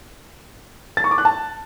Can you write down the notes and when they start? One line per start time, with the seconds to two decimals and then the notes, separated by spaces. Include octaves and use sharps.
0.97 A6
1.04 C#6
1.11 D6
1.18 F#6
1.25 A5